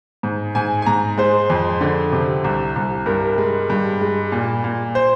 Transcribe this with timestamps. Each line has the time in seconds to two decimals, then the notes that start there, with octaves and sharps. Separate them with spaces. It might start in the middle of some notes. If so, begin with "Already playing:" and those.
0.23 G#2
0.55 G#2 G#5
0.82 G#5
0.86 G#2 A#5
1.18 G#3 C5
1.50 F2
1.81 D3
2.12 C3
2.44 C2
2.76 C2
3.06 G2 A#4
3.38 G#3
3.70 G2
4.01 G#3
4.32 A#2
4.64 A#2
4.95 C5